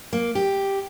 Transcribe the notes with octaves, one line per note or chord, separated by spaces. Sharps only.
A#3
G4